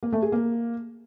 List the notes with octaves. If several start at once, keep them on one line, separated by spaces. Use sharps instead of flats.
A#3
A3
G#4
A#3